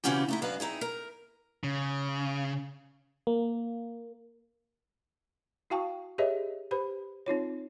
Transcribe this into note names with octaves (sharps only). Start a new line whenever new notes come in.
C#3 E3 C4 C#4 F#4 G4
A3 D#4 E4
F#2 D4 B4 D#5 F5 A5
C4 D#4 E4 G#4
A#4
C#3
A#3
E4 F#4 F5 G5 A5 C#6
G4 G#4 B4 C#5 D#5 E5
G4 B4 C5 B5
C4 D#4 F4 C#5